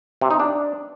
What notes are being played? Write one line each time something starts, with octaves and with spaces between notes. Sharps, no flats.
C3
D#4
D4